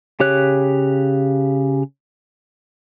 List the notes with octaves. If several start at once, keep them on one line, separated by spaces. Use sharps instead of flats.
C#3 G4 C#5 F#6